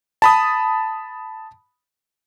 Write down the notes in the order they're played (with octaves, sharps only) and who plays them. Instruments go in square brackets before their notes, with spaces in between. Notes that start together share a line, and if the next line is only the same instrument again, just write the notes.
[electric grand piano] A5 B5 D#6